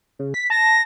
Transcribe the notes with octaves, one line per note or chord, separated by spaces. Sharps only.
C#3
B6
A5 A#6